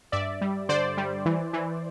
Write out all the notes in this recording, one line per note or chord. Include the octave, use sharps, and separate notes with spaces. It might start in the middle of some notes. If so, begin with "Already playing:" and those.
G2 D5 E5
G3
D3 C5 D5
G3
E3
E3